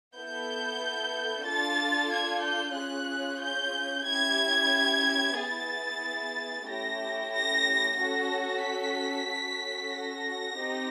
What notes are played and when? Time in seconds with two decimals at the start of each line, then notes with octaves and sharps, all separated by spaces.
0.15 B3 E4 A4 G6
1.45 D4 F4 A4 A6
2.11 G#6
2.43 G6
2.76 C#4 F4 G#4 F#6
3.41 G6
4.06 C#4 E4 G4 G#6
5.36 B3 E4 G#4 A6
6.67 A3 C#4 E4 G4 A#6
7.32 A#6
7.97 C#4 F#4 A4 A#6
8.63 B6
9.28 C#4 F#4 A4
9.93 A#6
10.58 C4 D#4 G4